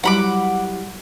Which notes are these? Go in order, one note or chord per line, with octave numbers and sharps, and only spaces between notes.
F#3 G3 E4 F#5 B5 D6